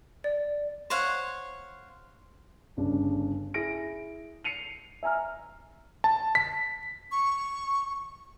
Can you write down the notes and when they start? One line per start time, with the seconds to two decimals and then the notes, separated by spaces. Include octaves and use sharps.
0.24 D5
0.90 C5 C#5 F5 F#5
2.77 G1 C#3 D4
3.54 E4 G#4 A#6 D7
4.44 C7 C#7 D#7 F7
5.03 E5 G#5 A#5 F6
6.04 A5
6.35 B6
7.12 C#6